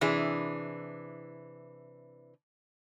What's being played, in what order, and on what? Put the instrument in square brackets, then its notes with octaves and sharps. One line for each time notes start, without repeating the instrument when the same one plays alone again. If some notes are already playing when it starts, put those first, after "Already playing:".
[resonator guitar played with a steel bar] C3 E3 D4 G#4